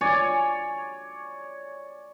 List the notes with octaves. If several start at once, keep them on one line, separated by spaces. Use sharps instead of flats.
C#5 D5 G#5